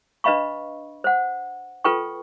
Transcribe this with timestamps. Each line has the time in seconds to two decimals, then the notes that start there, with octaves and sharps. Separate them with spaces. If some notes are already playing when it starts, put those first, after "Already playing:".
0.24 D4 B4 D#5 F5 B5 C#6
1.04 C5 F#5
1.84 F4 A4 B4 G5 C#6